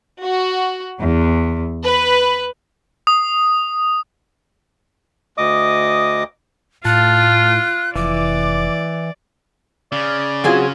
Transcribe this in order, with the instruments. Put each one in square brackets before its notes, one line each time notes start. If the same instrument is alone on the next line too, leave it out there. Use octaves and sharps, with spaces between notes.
[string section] F#4
E2
B4
[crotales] D#6
[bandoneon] D2 D#5 D6 D#6
[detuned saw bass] A2 [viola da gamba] F4 [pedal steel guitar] A5 [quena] F#6
[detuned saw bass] F1 [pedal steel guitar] E3 [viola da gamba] D5 [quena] D6
[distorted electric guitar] C#3 [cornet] D5
[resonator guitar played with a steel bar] F#3 C4 G#4 [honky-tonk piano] F4 F#4